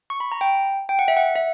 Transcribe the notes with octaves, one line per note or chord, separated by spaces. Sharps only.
C#6
B5
A#5
G5
G5
F#5
E5
F#5
E5